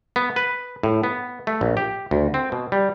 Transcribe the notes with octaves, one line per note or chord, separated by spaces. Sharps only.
B3
B4
A2
B3
A3
A#1
G4
D2
C4
B2
G3